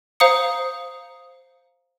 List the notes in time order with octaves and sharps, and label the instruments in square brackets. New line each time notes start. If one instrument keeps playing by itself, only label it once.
[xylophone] C5 F5 A#5 D#6 C#7